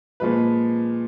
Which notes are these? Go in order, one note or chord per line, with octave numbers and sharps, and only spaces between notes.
A#2 F3 G#3 B4